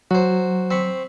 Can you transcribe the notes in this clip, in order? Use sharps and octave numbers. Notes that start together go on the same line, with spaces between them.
F#3 F#4 C5
C4 B5 C#6